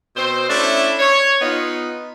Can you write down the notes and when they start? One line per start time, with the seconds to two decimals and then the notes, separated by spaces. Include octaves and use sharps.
0.16 B2 C4 C5
0.50 A3 C#4 D4 E4 A4
1.00 C#5
1.42 B3 D#4 F4